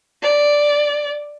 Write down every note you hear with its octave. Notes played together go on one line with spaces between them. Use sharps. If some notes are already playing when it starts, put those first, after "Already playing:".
D5